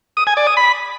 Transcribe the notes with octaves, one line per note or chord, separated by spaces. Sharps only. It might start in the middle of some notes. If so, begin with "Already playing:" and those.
D#6
G#5
D5
D#6
B5